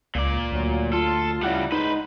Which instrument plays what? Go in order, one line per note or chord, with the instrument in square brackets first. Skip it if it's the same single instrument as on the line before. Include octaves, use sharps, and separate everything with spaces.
[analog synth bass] C#2 [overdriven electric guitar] A#2 D5
[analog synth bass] D2 [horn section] F#3
[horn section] F4 [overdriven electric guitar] A4
[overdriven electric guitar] C#3 G3 [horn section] E4 D5 F#5
[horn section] G#3 [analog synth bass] D#4 [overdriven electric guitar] B4 C5